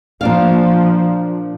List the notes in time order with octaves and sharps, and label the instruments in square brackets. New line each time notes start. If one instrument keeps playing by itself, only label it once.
[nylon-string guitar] A#2 D4 F5 [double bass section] F3